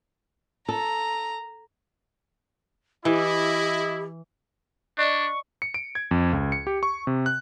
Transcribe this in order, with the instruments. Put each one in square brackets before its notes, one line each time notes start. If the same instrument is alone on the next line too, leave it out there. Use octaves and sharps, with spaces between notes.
[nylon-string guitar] A4 [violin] A#5
[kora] E3 [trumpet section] E4 [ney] G4 [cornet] D#5
[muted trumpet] D4 [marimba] D5 D#5 [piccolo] C#6
[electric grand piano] C#7
D7
G#6
F2
C#2
C#7
G4
C#6
C3
F#6